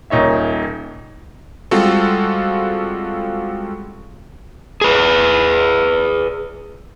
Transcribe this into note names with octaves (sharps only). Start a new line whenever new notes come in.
D#1 A#2 D#4 C#5 E5
G3 G#3 C4 F4 F#4 A4
G#4 B4